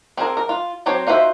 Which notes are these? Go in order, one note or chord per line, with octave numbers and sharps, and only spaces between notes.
C4 G#4 A#4
A#4
F4
F#3 C4 C5 C#5
D#4 F4 F#4 C5 E5